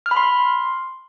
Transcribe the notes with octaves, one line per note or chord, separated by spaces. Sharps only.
F6
B5
C6